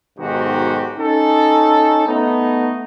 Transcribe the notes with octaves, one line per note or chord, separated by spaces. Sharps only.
B1 G#2 D#3 F#4 G4
C#4 D#4 A4
A3 B3 D#4